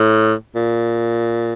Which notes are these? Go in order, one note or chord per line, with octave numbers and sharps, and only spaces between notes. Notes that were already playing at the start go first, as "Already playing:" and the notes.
Already playing: A2
A#2